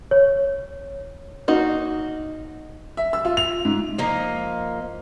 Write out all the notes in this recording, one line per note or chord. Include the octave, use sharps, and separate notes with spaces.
C#5
A#3 D#4 F#4
E5
E6
F4
F7
G#2
F3 A#3 D#4 A#5